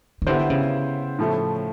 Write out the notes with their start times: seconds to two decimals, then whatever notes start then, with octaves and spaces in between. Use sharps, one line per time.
0.22 D#3
0.27 D3 B3 E4 G4 C5
0.50 C#3
1.19 A2 F3 A3